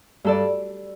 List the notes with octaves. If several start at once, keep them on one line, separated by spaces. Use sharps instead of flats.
G2 A4 D5